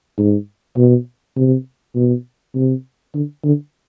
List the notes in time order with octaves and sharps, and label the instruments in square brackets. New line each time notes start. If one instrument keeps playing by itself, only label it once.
[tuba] G#2
B2
C3
B2
C3
D3
D3